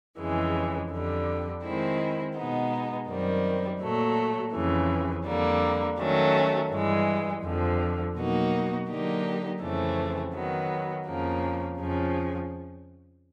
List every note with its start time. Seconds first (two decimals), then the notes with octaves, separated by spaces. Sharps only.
0.19 F2 C#3 E3 G#3
0.91 F2 D3 G3
1.63 D#3 G#3 C4 E4
2.36 B2 G#3 B3 D#4
3.08 F#2 D#3 G3 C4
3.81 A#2 F#3 A3
4.53 F2 C#3 E3
5.26 F2 D3 G3 A#3
5.99 D#3 F#3 A3 C#4
6.71 G2 E3 G#3
7.43 F2 D3 F3
8.16 B2 F#3 A#3 D#4 F#4
8.88 D3 F#3 A#3 D#4 G4
9.61 F2 C#3 E3 A3 C4
10.33 D#3 F#3 B3
11.06 F2 C#3 F3 A#3
11.79 F2 C#3 F3